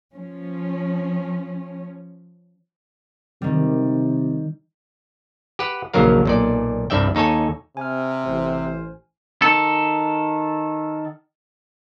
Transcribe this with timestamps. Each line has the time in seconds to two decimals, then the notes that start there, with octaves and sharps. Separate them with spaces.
0.13 F3 C#4
3.42 C3 D#3 G3
5.59 G4 B4 F#5
5.94 A#1 D#2 C#3 F#3 A#4 F5
6.26 B1 A#2 D5
6.90 C2 G2 D5 E5 G5
7.15 D#2 D#4 A4 C#5 G#5
7.77 C3 G#5 F6
8.25 A1 C5
9.42 D#3 A4